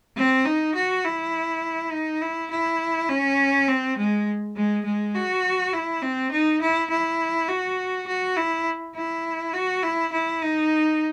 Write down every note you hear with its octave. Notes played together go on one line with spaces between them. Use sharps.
C4
D#4
F#4
E4
D#4
E4
E4
C#4
C4
G#3
G#3
G#3
F#4
E4
C4
D#4
E4
E4
F#4
F#4
E4
E4
F#4
E4
E4
D#4